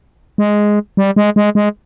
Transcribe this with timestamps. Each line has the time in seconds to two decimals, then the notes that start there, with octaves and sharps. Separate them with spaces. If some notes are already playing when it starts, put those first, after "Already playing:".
0.38 G#3
0.97 G3
1.16 G#3
1.36 G#3
1.55 G#3